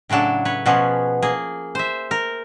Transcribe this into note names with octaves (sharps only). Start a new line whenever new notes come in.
A2 C#3 F#3 D4 A4
B4 C#5
B2 F3 B3 C#4 G#4
A#3 G#4
C5 E5
A#4